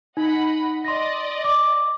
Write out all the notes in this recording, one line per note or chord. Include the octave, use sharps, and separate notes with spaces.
D#4 D#5 F#5 B5
D5 D#5 C6 A#6
D6